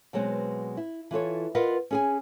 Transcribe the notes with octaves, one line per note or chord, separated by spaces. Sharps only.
B2 F#3 G#3 B3 C4
E4
E3 F4 A4 C#5
F4 A#4 B4 D#5 F#5
C#4 G#4 G#5